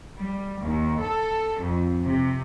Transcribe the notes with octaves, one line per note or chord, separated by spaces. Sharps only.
G3
D#2
A4
F2
C3